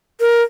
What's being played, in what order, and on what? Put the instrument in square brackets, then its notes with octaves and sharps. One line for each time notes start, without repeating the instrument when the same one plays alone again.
[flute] A#4